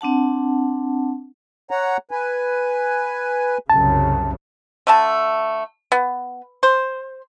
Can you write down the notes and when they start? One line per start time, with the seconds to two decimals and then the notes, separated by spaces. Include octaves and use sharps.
0.01 C4 D4 F#5 A5
1.71 C#5 F#5 A#5
2.11 B4 G#5
3.70 C2 F#2 C#3 A5
4.87 D3 A3 A5
5.92 B3
6.63 C5